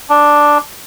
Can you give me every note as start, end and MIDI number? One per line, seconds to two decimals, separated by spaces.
0.10 0.58 62